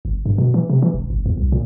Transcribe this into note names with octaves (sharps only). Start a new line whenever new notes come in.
G1
G2
B2
E3
C3
E3
E1
G1
E2
C2
A#2